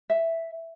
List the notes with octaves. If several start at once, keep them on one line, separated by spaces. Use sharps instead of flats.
E5